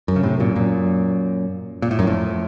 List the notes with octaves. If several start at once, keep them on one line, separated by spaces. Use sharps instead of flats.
F#2
C#3
A2 C3
F#2 A#2
F#2 A#2
A#2
A2
F#2
F2 A2